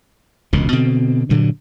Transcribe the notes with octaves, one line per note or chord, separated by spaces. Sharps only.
E1 C#2 B2
B2 D3 C4
G2 A#2 D3 F#3